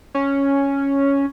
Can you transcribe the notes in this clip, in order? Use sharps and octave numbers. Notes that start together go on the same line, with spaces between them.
C#4